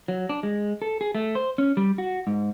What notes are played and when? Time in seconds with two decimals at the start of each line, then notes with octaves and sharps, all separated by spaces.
0.08 F#3
0.29 D4
0.43 G#3
0.82 A4
1.01 G#4
1.15 A3
1.35 C5
1.58 C#4
1.77 G3
1.98 F#4
2.27 G#2